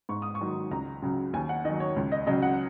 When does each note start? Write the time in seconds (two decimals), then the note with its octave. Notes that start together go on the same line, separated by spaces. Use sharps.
0.09 G#2 C#6
0.22 D#6
0.35 C#6
0.41 D#3 F#3
0.71 C#2 A#5
1.02 C#3 F#3
1.33 D#2 G#5
1.49 F#5
1.65 D#3 D#5
1.70 F#3
1.80 C#5
1.96 C#2
2.12 D#5
2.27 C#3 F#3 D#5
2.42 F#5